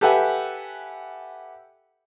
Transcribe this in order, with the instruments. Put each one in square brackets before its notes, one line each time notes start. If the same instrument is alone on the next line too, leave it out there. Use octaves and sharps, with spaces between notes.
[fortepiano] G4 A4 B4 E5 F#5 G#5